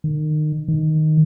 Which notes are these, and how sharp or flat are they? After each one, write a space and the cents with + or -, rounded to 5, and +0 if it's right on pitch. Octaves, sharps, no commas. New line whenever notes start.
D#3 -30
D#3 -5